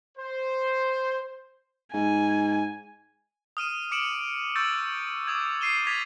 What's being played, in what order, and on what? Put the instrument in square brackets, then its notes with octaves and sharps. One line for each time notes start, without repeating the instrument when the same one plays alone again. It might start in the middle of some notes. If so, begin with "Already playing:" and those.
[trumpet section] C5
[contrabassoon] G#2 [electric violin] G#5
[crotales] D#6 F6 D#7 E7
D6 C#7 D7 E7 F#7
C#6 E6 G6 A6
D6 D#6 G#6
C7 D#7 E7 G7
D6 G#6 A6 B6 F7